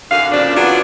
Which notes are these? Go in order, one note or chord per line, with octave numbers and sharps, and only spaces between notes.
F#2 D3 D#3 F#4 F5
A#2 C#3 F3 C4 D4
E3 F#3 B3 D4 F4 F#4